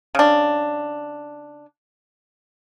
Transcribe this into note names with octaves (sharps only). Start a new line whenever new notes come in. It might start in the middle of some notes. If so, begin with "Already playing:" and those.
C#3 D4